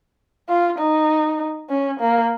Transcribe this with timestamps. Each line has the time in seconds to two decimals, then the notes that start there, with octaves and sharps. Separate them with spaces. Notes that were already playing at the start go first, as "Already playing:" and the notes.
0.49 F4
0.78 D#4
1.70 C#4
2.00 A#3